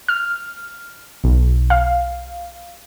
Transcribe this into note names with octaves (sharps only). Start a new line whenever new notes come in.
F6
B1
F5